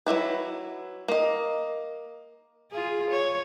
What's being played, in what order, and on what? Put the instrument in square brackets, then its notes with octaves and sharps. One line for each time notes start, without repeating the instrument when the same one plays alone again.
[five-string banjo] F#3 A#3 E4 B4
A#3 D#5
[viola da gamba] F4 G#4
C#5